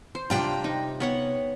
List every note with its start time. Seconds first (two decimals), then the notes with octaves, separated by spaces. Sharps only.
0.15 C5
0.30 C3 G3 D4 F4 G5 A#5
0.64 D#4
1.00 B3 C#5 F#5